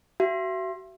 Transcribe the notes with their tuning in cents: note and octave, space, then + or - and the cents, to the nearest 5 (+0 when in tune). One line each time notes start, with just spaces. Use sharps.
F#4 +30 E5 +35